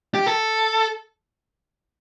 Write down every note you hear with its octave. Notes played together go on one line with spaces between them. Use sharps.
G4
A4